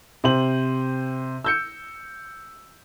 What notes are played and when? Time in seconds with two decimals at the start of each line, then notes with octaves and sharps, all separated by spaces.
0.24 C3 C5 F#7
1.45 E6 G6 C#7